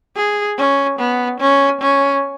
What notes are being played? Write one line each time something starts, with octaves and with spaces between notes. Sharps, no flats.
G#4
C#4
B3
C#4
C#4